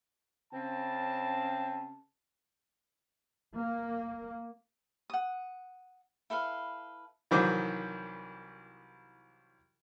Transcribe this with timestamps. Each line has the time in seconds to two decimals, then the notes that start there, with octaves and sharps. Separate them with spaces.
0.52 C#3 C4 A5
3.54 A#3
5.10 F#5 D#6
6.30 E4 A4 B4 F5
7.31 C2 D#3 E3 F#3 C5 D6